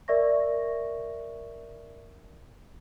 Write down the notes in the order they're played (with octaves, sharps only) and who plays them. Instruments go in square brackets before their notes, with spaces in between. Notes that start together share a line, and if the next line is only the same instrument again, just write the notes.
[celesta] A#4 D5 E5 C#6 A#6